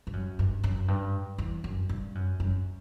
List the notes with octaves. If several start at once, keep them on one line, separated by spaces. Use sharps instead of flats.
G2
F#2
G2
F#2
G2
E2
F#2
G2
F#2
F#2